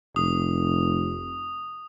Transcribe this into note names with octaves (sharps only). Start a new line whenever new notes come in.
F1 D#6